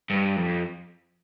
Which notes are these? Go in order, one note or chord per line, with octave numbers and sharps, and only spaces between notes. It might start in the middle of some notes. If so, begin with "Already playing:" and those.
G2
F2